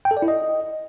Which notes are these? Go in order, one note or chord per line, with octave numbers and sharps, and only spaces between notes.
G5
A4
D5
E4
D#5